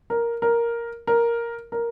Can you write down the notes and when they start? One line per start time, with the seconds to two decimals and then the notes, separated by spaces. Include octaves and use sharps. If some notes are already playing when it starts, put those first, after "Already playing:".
0.10 A#4
0.42 A#4
1.07 A#4
1.72 A#4